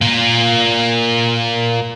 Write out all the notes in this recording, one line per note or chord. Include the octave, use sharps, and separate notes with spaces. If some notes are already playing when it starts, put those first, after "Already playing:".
A#3 F4